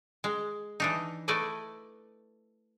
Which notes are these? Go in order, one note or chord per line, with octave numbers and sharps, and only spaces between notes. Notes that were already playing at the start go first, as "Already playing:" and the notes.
G#3
E3 D4 D#4
A3 E4 B4 D5 D#5